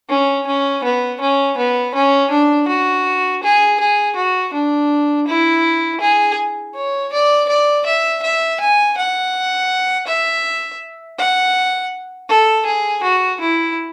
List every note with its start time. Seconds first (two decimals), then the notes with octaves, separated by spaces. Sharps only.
0.09 C#4
0.47 C#4
0.84 B3
1.21 C#4
1.58 B3
1.95 C#4
2.31 D4
2.68 F#4
3.43 G#4
3.80 G#4
4.16 F#4
4.54 D4
5.28 E4
6.01 G#4
6.75 C#5
7.13 D5
7.49 D5
7.86 E5
8.23 E5
8.61 G#5
8.98 F#5
10.07 E5
11.18 F#5
12.29 A4
12.66 G#4
13.03 F#4
13.41 E4